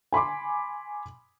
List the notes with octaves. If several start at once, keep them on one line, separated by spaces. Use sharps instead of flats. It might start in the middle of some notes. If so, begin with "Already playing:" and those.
G#5 B5 C6 D6